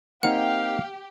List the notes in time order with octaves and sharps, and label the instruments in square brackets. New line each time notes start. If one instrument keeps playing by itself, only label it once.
[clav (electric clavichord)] A#3 C4 D#4 [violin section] G4 [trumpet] F5 [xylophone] F#5